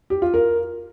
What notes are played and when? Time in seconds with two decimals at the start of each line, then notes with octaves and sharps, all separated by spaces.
0.10 G4
0.22 F4
0.34 A#4